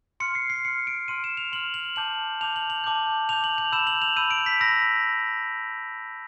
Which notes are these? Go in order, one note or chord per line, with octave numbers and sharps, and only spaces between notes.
C6 F6 C#7
C7
C7
C6 F6 C#7
D7
C6 F6 D#7
E7
F7
C6 F6 F#7
F#7
A5 D6 G6 F#7
A5 D6 G6 F7
F#7
F#7
A5 D6 G6
A5 D6 G6 F7
F#7
F7
B5 E6 G6 E7
F#7
F7
B5 E6 G6 D#7
D7
B6
B5 E6 A#6